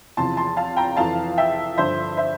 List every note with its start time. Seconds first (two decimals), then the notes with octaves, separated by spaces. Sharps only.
0.17 E2 C3 F3 A5 C6
0.37 A5 C6
0.57 F5 A5
0.77 G5 A#5
0.97 F2 E3 F5 A5
1.38 E5 G5
1.77 G2 D3 F3 C5 E5
2.17 C5 E5